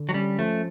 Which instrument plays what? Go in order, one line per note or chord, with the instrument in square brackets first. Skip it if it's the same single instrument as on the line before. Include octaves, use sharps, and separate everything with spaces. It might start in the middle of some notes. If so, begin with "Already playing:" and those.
Already playing: [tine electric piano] D3
[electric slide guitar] F#3
[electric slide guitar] G3 [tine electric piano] C#4
[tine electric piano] F3 [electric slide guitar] A3